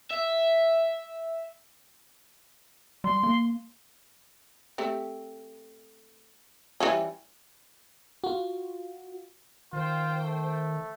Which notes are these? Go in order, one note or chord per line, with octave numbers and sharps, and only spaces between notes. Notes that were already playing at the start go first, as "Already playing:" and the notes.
E5
G3 C6
A#3
A3 C4 G4
E3 G3 C#4
F4 F#4
D#3 F4 C5 G5
A3